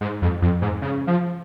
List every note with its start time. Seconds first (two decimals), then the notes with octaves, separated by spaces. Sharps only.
0.01 G#2
0.22 F2
0.42 F2
0.62 G#2
0.82 C#3
1.07 F3